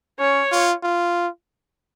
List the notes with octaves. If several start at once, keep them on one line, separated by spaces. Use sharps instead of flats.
C#4 C#5
F4
F4